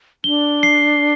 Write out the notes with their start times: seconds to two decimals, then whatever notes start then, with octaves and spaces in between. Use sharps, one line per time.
0.24 D4 G7
0.63 C7